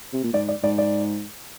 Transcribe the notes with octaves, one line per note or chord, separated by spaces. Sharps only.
C3
A#2
G#2 D5
D5
G#2 D5
D5